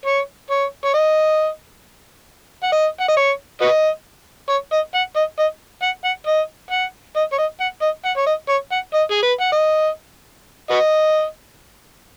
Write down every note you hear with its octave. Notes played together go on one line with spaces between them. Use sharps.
C#5
C#5
C#5
D#5
F#5
D#5
F#5
D#5
C#5
F#4 B4 D#5
C#5
D#5
F#5
D#5
D#5
F#5
F#5
D#5
F#5
D#5
C#5
D#5
F#5
D#5
F#5
C#5
D#5
C#5
F#5
D#5
G#4
B4
F#5
D#5
F#4 B4 D#5